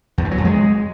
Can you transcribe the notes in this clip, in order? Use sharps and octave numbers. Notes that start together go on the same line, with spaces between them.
E2
G2
F#3
F2
G#3